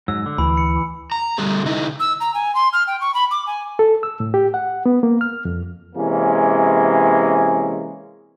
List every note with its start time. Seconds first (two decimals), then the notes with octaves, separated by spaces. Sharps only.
0.08 G#2 F#3 E6
0.26 D3
0.38 D2 E3 B5
0.57 C#7
1.12 A#5
1.38 D3 G3 A3 G#4
1.65 C#3 D#4 E4
2.00 E6
2.20 A#5
2.34 G#5
2.55 C6
2.73 F6
2.87 G5
3.01 C#6
3.14 B5
3.31 D6
3.47 G#5
3.79 A4
4.03 E6
4.20 A2
4.34 G4
4.54 F#5
4.86 B3
5.03 A#3
5.21 F6
5.45 F2
5.96 C3 E3 G#3 A#3 C#4